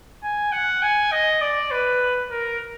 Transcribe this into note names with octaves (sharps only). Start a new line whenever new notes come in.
G#5
F#5
G#5
D#5
D5
B4
A#4